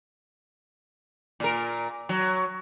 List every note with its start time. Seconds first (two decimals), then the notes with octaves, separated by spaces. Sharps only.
1.40 A#2 A#4
2.09 F#3